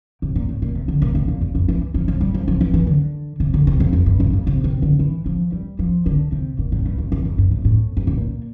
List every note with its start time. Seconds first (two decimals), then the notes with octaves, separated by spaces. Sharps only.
0.22 C3
0.36 A#2
0.49 A2
0.62 A#2
0.75 C3
0.88 D3
1.02 A#2
1.15 A2
1.28 A#2
1.41 F2
1.55 G2
1.68 E3
1.94 F3
2.08 F3
2.21 G3
2.34 F3
2.48 F3
2.61 E3
2.74 E3
2.87 D3
3.40 C3
3.54 D3
3.67 C3
3.80 F2
3.93 G2
4.06 G2
4.20 F2
4.33 F2
4.47 C3
4.64 C3
4.82 D3
4.99 E3
5.26 F3
5.52 G3
5.79 F3
6.06 D3
6.32 C3
6.59 A#2
6.72 A2
6.86 G2
6.98 F2
7.12 E2
7.25 F2
7.38 G2
7.51 A2
7.65 A2
7.97 G2
8.07 A2
8.17 A#2